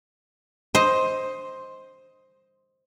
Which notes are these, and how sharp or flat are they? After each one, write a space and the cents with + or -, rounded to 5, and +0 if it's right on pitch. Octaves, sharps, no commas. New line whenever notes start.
C5 +5 D#5 +15